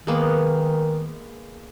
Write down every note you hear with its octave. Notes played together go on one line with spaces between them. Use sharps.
D#3 G#3 A#3 B3